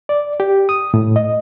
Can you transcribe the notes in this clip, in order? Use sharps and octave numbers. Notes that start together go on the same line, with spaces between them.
D5
G4
D#6
A2
D#5